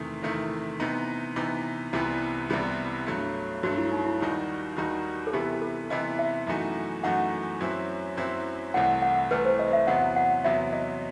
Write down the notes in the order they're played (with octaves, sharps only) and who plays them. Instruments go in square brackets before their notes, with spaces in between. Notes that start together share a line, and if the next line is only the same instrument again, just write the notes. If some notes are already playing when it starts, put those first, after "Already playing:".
Already playing: [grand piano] E2 C3 D#3 A3 E4
E2 C3 D#3 A3 E4
C3 E3 B3 D#4
C3 E3 B3 D#4
[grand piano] C2 C3 E3 G3 B3 [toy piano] E4
[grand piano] C2 C3 E3 G3 B3
G2 F#3 A3
[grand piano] G2 F#3 A3 [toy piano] F#4
[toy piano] E4
D#4
E4
[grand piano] D#2 D#3 G3 D#4 F#4
D#2 D#3 G3 D#4 F#4
[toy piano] A4
[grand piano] C3 E3 B3 E4 [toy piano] G4
[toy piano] A4
[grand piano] C3 E3 B3 E4 [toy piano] D#5
[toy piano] E5
[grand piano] F#2 E3 A3 D#4 F#4
[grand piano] F#2 E3 A3 D#4 F#4 [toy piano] F#5
[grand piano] F#2 F#3 C4 E4
F#2 F#3 C4 E4
[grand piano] C2 C3 E3 A3 [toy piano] F#5
[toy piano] F#5
[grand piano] C2 C3 E3 A3 [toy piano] B4
[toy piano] C5
D#5
E5
[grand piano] E2 C3 F#3 B3 [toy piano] F#5
[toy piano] F#5
[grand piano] E2 C3 F#3 B3 [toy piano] E5
[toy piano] D#5